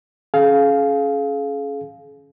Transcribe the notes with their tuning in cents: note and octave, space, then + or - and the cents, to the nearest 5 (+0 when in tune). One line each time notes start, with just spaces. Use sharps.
C#4 +0 G#4 +40 F5 +0